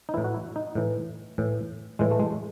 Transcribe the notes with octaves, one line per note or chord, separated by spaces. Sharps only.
D#4
A2 E3 E4
F#4
E4
D#4
A2 E3
A2 E3
A2 E3 G#3
A3
G#3